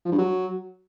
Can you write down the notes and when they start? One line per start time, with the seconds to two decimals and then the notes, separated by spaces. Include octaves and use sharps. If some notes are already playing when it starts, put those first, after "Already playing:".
0.05 F3
0.12 G2
0.18 F#3